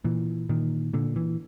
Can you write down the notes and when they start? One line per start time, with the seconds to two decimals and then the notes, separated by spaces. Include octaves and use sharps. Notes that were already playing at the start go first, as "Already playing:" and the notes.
0.04 A#2 E3
0.49 A#2 D#3
0.94 A#2 D3
1.16 E3